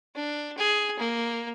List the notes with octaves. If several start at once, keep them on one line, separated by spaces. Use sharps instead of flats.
D4
G#4
A#3